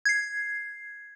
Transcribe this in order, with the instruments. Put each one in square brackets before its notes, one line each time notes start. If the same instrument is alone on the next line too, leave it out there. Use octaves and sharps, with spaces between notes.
[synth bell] G#6 C7